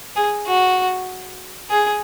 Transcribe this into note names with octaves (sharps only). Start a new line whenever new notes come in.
G#4
F#4
G#4